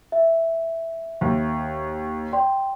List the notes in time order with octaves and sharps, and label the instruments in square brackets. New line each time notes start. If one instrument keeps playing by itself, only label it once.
[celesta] E5
[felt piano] D#2
[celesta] D5 G5 C6